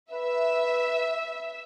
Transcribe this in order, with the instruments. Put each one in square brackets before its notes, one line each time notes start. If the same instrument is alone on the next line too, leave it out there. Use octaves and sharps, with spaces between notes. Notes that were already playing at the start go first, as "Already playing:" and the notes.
[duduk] B4 [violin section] E5